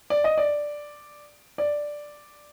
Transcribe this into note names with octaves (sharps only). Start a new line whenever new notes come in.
D5
D#5
D5
D5